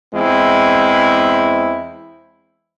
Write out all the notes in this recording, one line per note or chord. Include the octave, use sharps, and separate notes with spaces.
E2 G#3 C4 E4